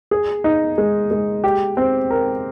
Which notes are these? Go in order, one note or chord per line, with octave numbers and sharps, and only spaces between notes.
G#4
D#4
G#3
G#3
G4
C4
A#4